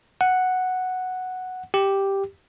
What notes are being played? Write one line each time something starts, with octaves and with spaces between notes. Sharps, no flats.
F#5
G4